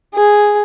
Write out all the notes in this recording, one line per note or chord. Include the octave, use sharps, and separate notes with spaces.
G#4